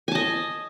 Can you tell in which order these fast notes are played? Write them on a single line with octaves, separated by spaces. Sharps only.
G#5 A5 D#5